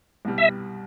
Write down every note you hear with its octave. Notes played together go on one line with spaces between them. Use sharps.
C2 B2 G3
E5